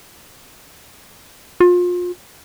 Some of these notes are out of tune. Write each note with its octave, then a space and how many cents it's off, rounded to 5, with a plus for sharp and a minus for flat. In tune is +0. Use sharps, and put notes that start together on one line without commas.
F4 +30